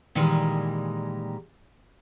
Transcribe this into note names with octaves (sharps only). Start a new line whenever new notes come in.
A#2 D#3 E3 G3 G#3